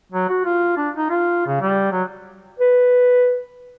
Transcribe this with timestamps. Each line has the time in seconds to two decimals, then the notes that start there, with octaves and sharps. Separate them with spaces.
0.12 F#3
0.29 F#4
0.45 F4
0.77 D4
0.97 D#4
1.10 F4
1.47 C#3
1.61 G3
1.92 F#3
2.59 B4